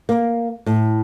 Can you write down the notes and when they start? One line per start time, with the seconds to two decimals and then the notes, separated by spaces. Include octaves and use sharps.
0.09 A#3
0.66 A2